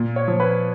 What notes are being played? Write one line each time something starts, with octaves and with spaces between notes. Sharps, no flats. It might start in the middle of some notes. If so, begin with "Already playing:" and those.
Already playing: A#2
C#5
F3
B4